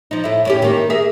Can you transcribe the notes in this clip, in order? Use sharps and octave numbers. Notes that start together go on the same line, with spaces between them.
F3 D#4
A2 E4
A2 C#4 G4
D#3 A#3
G#4 A#4 E5